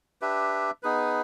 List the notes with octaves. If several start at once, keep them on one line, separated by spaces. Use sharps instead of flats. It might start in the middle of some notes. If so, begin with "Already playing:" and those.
D4 G4 B4 E5
B3 D#4 G#4 B4